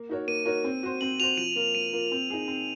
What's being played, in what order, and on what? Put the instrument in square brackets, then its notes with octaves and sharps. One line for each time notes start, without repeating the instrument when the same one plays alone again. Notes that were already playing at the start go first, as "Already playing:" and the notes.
Already playing: [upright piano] A#3
D#4 F#4 A#4 C#5
[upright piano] A#3 [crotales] D#7
[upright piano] D#4 F#4 A#4 C#5
C4
F#4 C5
[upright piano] C4 [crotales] F#7
[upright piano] F#4 C5 [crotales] F7
[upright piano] F3 [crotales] D#7
[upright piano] A#3 F4 A#4
[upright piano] F3 [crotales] D#7
[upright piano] A#3 F4 A#4
C4
D#4 G#4
C4